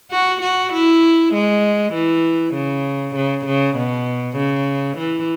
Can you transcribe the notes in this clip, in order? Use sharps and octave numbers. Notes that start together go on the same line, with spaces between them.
F#4
F#4
E4
G#3
E3
C#3
C#3
C#3
B2
C#3
E3